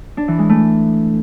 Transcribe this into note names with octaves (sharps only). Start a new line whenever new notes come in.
D4
E3
G#3
A3